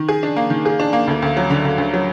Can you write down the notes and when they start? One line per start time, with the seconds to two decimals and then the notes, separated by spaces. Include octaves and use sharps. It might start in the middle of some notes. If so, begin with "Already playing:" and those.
Already playing: D#3
0.09 G#4
0.23 D4
0.36 A#3
0.50 D#3
0.65 G#4
0.80 D4
0.93 A#3
1.07 D2
1.22 D2
1.37 F#3
1.50 D3
1.65 D2
1.78 D2
1.93 F#3